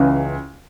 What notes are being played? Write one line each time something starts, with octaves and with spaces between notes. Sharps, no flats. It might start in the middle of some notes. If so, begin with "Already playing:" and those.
Already playing: C#2 C#3 E3